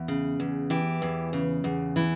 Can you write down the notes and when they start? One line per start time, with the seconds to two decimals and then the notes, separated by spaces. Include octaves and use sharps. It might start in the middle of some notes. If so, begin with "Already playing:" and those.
Already playing: E2
0.08 C#3
0.40 E2
0.70 E3 G4
1.02 E2
1.33 C#3
1.64 E2
1.96 E3